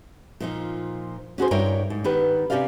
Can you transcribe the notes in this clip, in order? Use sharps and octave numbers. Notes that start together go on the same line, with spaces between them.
A#2 F3 D#4
C#4 F#4 G#4 C5
G2 E4 A#4 C#5 G5
G#2
D#3 B3 G4 B4
C3 C#4 G4 A#4 D5 F5